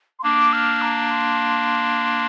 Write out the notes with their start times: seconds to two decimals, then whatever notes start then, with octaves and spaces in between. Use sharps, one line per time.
0.19 C6
0.23 A#3 D4 D6
0.53 F6
0.82 A#5
1.11 C6